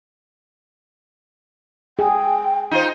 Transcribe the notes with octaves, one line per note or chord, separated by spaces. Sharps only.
G#4 G5
D#4 F4 C5